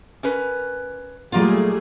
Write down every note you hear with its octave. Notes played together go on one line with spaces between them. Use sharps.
C#4 A#4 B4
A#2 F#3 G3 A3 A#3 F4 G#4